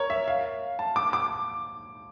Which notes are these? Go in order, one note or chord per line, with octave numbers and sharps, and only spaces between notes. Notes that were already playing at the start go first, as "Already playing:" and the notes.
Already playing: A#4 C#5
E5
F5
A5
D6
D6